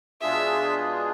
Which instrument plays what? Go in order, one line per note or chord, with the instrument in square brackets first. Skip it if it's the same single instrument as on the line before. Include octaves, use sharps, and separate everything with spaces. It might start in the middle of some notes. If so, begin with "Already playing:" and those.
[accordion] B2 G#3 D4 F4 G#4 [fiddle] E5